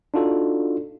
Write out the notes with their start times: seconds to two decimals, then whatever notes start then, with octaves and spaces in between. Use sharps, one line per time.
0.14 D4 D#4 F4 F#4 A4